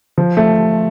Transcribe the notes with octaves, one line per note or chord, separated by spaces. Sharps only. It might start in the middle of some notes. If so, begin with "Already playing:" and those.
F3
A3